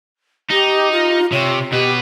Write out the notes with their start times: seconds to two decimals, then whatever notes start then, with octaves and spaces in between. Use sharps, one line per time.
0.50 D#4 G4
0.92 F4
1.32 C3 C#5
1.72 B2 G4 B4